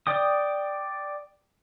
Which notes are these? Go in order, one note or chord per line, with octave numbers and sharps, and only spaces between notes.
D5 G5 D#6